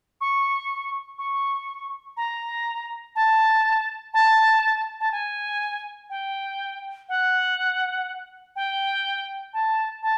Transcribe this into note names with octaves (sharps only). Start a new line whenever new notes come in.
C#6
C#6
A#5
A5
A5
A5
G#5
G5
F#5
G5
A5
A5